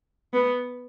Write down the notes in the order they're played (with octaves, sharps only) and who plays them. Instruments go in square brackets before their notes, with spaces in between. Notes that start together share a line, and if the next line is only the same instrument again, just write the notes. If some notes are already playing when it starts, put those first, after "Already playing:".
[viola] B3